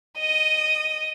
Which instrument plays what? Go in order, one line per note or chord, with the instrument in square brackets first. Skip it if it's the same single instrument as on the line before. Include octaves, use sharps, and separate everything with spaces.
[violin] D#5 D#6